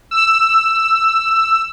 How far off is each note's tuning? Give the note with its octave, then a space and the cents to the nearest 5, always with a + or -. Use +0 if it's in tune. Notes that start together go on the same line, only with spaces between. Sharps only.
E6 +10